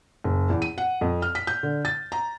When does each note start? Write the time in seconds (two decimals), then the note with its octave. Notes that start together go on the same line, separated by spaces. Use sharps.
0.24 F#1
0.50 E2
0.62 D#7
0.78 F#5
1.01 F2
1.22 F6
1.35 B6
1.47 G6
1.63 D3
1.85 A6
2.12 A#5